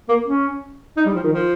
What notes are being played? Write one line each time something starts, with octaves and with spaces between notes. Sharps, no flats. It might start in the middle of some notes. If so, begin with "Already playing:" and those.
A#3
C#4
D#4
G3
F3
D#3
F3